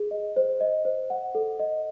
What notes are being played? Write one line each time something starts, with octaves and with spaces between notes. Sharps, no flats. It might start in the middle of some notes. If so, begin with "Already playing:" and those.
Already playing: G#4
D#5
C5
D#5
C5
F#5
A4
D#5